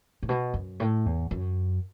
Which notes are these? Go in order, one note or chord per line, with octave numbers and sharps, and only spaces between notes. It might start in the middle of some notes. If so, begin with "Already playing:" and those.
A2
B2
F#2
A2
E2
F#2